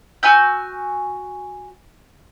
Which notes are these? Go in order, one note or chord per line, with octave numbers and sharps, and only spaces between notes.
F#4 G#5 E6 G6